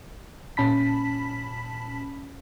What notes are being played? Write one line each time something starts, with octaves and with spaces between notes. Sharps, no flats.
A#2 C#4 A5 B5 B6